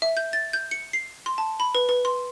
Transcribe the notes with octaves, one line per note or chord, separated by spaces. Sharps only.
E5
G6
A6
G6
C#7
C7
C6
A5
B5
B4
B4
C6